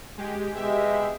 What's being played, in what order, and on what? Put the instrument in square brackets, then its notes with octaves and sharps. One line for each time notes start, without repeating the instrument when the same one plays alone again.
[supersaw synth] G#3 G4
[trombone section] B2 G#3 [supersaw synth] G4 E5